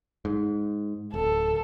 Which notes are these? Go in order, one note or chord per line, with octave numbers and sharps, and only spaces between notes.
G#2
D1 A4